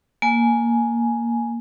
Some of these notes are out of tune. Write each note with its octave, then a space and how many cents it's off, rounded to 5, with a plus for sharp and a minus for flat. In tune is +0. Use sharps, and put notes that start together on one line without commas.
A#3 +0 G#5 +10